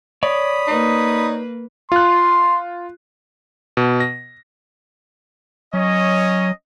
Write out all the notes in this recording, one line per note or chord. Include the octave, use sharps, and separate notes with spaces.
C#5 D5 B5 D#6
A#3 D#4 B4
F4 C6 F#6
B2
A#6
F#3 C#4 C#5 D#5